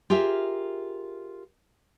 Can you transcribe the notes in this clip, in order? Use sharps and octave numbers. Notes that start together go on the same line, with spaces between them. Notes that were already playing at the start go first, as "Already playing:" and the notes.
F4 G4 G#4 A#4 E5